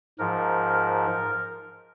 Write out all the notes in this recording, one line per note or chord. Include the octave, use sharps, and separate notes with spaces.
G#2 F3 A#4
A#4